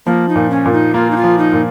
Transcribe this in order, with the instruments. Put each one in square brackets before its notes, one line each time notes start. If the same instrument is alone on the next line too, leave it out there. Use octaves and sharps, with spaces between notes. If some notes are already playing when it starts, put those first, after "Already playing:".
[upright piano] F3 [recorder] A#3
[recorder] D#4
[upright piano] A#2
[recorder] C#4
[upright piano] A#2
[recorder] D#4
[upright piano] A#3 [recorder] F4
[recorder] D#4
F4
[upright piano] F3
[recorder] D#4
[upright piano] A#2